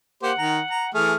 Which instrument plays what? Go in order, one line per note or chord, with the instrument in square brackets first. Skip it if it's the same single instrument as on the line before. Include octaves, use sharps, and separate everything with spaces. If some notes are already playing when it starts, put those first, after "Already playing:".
[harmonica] A#3 G4 C5 [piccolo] F#5
[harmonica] D#3 A#5
A#5
[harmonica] E3 A3 G#4 [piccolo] F6